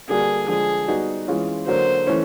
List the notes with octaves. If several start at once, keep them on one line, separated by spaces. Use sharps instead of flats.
D3 G3 A#3 D4 F#4 G#4
D3 F3 G#3 G#4
G3 B3 D#4 F#4
E3 G#3 C#4 F4
D3 F#3 A#3 C5
E3 A3 C#4